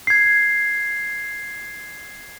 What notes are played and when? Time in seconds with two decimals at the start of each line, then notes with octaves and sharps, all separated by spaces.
0.07 G#6 C7